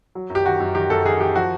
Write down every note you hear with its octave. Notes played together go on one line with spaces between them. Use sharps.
F#3
F#2
G4
D#3 F#4
F#2
D#3 G4
F#2 A4
D#3 G#4
D#3 G4
F3 F#4